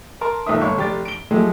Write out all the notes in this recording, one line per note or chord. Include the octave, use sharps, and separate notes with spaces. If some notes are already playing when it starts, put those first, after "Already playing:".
A#4 A5 C6
B1 A#2 D#3 A3 E5 D#6
G1 C#5 C#6
F1 G4 D5 A6
D7 G7
F3 F#3 G#3 A3 G4